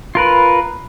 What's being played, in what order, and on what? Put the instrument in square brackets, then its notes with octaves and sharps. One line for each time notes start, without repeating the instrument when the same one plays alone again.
[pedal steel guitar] F4 A#4 B4